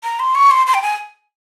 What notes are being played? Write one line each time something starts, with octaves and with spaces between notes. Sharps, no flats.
A#5
C6
C#6
C6
C6
G5
G#5